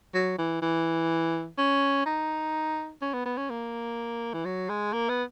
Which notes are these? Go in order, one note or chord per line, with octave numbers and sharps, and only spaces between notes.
F#3
E3
E3
C#4
D#4
C#4
B3
B3
C#4
A#3
E3
F#3
G#3
A#3
B3